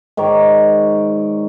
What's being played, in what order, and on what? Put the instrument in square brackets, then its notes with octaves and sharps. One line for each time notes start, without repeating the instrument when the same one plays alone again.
[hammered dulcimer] G#2 D#3 C#5 D5